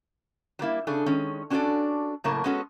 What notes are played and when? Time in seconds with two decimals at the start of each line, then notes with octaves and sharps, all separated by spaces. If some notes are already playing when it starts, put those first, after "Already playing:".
0.59 F#3 G3 A#3 E4
0.87 C#3 D4 G#4 A4
1.06 D#3 G#3 C#4
1.50 C#4 D4 F#4 G#4 A4 D5
2.24 F#2 A2 C#3 A#3 A#4 A5
2.44 G#3 B3 C#4 F#4 A4